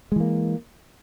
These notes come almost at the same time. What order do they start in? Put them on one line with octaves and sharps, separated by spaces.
G#3 E3 A#3